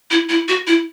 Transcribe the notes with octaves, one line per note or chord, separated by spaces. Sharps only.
E4
E4
F#4
E4